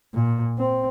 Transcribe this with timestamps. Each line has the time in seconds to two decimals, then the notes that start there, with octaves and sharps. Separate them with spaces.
0.14 A#2
0.59 C4